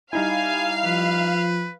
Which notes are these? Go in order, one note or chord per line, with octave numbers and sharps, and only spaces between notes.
G3 D#4 E4 F5 G#5
F3 B4